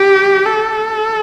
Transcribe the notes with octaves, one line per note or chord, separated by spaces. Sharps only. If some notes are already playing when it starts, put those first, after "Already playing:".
Already playing: G4
A4